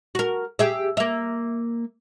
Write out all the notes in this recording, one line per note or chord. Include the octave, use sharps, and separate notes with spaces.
F#4 A#4
G4 G#4 E5
A#3 E5